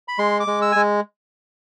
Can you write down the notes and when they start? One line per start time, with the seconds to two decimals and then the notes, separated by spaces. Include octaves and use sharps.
0.08 B5
0.18 G#3 C6
0.40 D6
0.47 G#3
0.62 E6
0.72 G#3 G#5